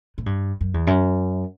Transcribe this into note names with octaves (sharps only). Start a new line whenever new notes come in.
A2
G2
F#2
E2
F#2